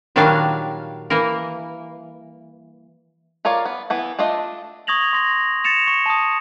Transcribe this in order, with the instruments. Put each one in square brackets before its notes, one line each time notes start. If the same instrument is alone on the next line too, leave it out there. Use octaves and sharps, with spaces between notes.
[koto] A#2 D#3 F#3 G3 D4 F5
E3 A#3 A#4
[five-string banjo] F4 A#4 C#5 D5 F5
B3
E3 B3 E4
A3 D4 F4 D#5
[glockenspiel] C#6 D#6 G#6 A#6 F7 F#7
C6 A#6
A6 A#6 C#7 E7 F7
C#6
A5 D#6